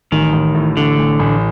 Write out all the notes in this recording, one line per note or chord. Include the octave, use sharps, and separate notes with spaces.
A1 D#3
A1
A2
D3 A3
A1
A1